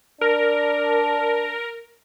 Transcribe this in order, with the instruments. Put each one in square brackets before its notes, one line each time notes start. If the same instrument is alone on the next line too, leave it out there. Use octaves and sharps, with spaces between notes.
[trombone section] D4 [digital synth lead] A#4